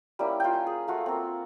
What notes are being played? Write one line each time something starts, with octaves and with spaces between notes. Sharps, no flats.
G3 A#3 C#4 E4
F4 G5
G#5
G#4
A3 F4 F#4
A#3 C4